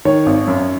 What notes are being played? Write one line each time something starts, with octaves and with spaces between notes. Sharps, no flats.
D#3 C#5
G#1
F#2